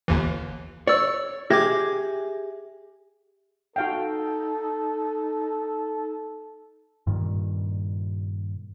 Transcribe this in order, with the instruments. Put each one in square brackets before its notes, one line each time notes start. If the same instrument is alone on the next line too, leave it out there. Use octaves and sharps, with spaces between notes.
[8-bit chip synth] G1 D#2 E3
[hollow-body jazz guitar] C#5 [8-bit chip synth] D5 E6
[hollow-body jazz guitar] G4 G#4 E5 [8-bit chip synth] D6 G#6 A#6
[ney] D#4 [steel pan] F#4 F5 G5 [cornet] A4
[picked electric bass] G2 A#2 D#3 G3